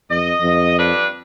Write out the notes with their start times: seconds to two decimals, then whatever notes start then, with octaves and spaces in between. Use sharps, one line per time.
0.10 F2 D#5
0.42 F2
0.78 G2 D4 B4